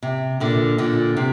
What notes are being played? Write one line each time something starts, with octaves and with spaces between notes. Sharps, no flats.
C3
A#2 D3
A#2 D3
C3